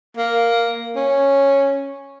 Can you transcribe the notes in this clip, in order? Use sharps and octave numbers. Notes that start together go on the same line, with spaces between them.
A#3
C#4